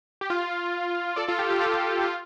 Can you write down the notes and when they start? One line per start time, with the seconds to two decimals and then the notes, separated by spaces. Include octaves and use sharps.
0.21 G4
0.30 F4
1.16 A4 D5
1.28 F4 A4
1.39 G4
1.50 G4
1.61 F4 A4
2.04 F4